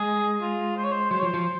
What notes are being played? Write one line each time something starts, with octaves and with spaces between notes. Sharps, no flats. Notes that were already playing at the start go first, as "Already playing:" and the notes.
Already playing: G#3 G#4
F4
C5
C#5
C5
F#3 C5
C#5
F3
C5
F3